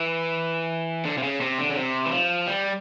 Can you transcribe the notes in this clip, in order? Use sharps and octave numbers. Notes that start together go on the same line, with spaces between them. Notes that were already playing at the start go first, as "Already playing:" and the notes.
Already playing: E3
D3
C3
C#3
C3
D3
C#3
C3
E3
F3
G3